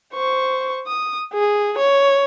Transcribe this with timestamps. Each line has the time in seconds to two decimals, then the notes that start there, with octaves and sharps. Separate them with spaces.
0.14 C5 C#6
0.87 D#6
1.34 G#4
1.78 C#5